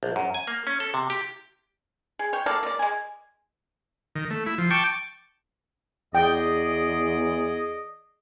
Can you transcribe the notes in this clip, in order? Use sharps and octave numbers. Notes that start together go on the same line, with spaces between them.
A#1
F#2
G#5
A#3
C#4
A4
C3
G4
G#4
C#5 G5
A#3 A4 D5 F5
A#3 D5
G#3 G#5
D#3
A3
E4
F3
G5 A5 C#6 D6
E2 G#4 D5 D#5 G5